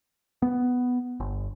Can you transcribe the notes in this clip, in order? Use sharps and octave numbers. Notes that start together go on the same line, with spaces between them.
B3
G1